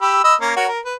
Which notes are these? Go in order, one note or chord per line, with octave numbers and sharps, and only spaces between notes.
G4 B5 E6
D#5 B5 E6
A#3 C#4 A#5
F#4 A#4 C#5
A#4
B4